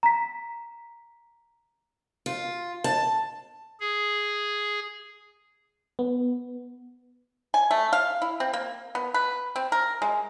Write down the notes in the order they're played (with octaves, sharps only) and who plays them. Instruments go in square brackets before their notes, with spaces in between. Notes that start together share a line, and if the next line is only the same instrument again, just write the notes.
[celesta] A#5 B6
[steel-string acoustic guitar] F4
A5
[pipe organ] G#4
[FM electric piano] B3
[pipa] G#5
A3
F5
E4
C4
A#3
B3
B4
C4
A#4
G#3